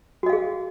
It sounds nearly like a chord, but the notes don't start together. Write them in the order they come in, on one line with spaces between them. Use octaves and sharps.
F#4 D#5 F5 G#4